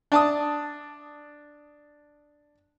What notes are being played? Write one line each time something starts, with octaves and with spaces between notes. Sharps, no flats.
D4 A5 D#6